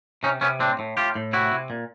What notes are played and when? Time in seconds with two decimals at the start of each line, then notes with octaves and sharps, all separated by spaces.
0.23 C3 C#4 D#4
0.41 C3 B3 C#4
0.59 A2 C4 D4
0.79 A2
0.97 A2 F4 G4
1.15 A2
1.33 C3 E4 F#4
1.51 C3
1.70 A#2